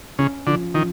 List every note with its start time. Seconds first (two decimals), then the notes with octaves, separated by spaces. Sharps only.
0.19 C#3 C#4
0.46 D3 F3
0.75 D#3 F3